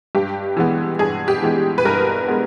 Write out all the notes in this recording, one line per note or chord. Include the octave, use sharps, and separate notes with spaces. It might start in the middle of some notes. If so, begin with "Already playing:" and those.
G2 G4
E3 G#3 B3
G2 G#4
G4
E3 G#3 B3
B4
G2 A#4
G#3 B3